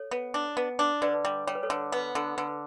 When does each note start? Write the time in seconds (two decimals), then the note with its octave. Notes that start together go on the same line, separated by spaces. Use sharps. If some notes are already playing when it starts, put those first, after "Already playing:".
Already playing: A4 C#5
0.11 B3
0.34 D4
0.57 B3
0.79 D4
1.02 D3 B4 D5
1.25 G3
1.47 G3 C#5
1.55 B4
1.63 A4 C#5
1.70 D3
1.92 B3 B4
2.15 D3 A4
2.38 D3 B4